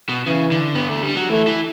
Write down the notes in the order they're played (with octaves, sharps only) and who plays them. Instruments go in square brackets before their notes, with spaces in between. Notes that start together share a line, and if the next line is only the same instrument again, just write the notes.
[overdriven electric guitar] B2
[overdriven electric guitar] C#3 [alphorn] E3
[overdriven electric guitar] D3
B3
A3
G3
F#3
[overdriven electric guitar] E3 [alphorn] A3
[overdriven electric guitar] E3